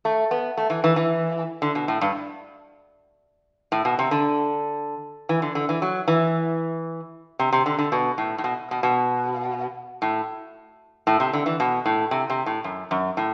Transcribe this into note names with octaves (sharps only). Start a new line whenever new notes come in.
A3
B3
A3
E3
E3
E3
D3
B2
A2
G2
A2
B2
C3
D3
E3
D3
D3
E3
F#3
E3
C3
C3
D3
D3
B2
A2
A2
B2
B2
B2
A2
A2
C3
D3
E3
B2
A2
C3
C3
A2
F#2
F#2
A2